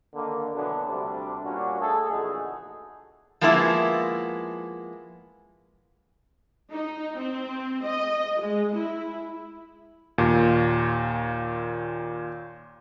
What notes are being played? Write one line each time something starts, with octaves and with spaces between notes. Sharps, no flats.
D3 D#3 A#3
B2 D3 E3 F#3 B3 D4
D2 C3 G3 D4
A#2 G3 C#4 D4 F#4
A3 G#4 A4
A#1 E2 D3 D#4 F#4 G#4
F3 G#3 A#3 B3 E4
D#4
C4
D#5
G#3
E4
D#2 A#2